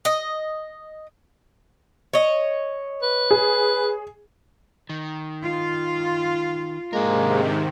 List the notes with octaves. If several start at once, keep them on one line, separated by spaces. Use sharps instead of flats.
D#5
C#5 D#5
B4
G#4
D#3
F4
G#2 C3 D#3 G#3 A#3 D4 A#4